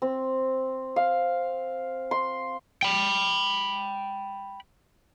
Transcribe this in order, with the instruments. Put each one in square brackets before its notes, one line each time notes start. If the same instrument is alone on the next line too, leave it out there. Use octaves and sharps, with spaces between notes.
[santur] C4
F5
C6
[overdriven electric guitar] G5 B5